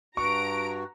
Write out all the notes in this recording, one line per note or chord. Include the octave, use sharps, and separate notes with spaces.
G2 F#4 A#5 C#6 D7